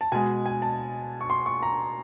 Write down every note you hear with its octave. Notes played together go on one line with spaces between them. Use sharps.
A5
B2 G#3 G#5
G#5
A5
C#6
C6
C#6
A#5